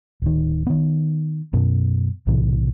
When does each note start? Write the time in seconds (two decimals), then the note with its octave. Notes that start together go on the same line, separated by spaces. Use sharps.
0.22 D1 D#3
0.67 D#3 B3
1.53 F#2 B2
2.27 B1 A2 C3 E3